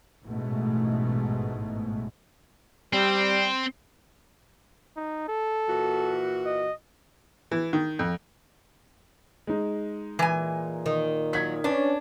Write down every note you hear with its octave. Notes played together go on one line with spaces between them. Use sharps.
A1 G#2 B2 G#3 A3
G3 C4
D#4
A4
A#2 E3 F#4
D#5
E3
D#3
F2
G#3 D#4
A#2 E3 G#5
D#3
F#3 G#6 B6
C#4 D4 B4 C#5